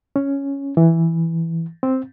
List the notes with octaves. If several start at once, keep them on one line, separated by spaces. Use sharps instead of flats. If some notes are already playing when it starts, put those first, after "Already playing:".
C#4
E3
C4